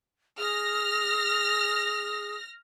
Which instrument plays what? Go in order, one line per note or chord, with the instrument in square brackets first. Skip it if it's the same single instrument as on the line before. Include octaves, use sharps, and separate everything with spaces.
[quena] G#4 [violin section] F6 A#6